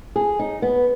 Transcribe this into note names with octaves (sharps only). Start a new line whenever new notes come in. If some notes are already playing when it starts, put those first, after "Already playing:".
G#4
D#4
B3